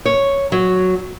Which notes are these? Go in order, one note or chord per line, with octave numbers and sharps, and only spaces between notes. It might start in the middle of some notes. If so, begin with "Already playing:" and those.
C#5
F#3